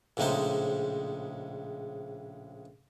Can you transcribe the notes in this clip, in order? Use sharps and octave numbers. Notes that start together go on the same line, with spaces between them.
A#1 A2 C#3 G#3 D#4 C5